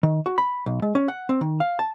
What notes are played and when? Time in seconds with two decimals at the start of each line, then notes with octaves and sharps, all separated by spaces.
0.03 D#3
0.26 F#4
0.38 B5
0.66 B1
0.82 G#3
0.95 C#4
1.08 F#5
1.29 C4
1.41 D#3
1.60 F5
1.79 A5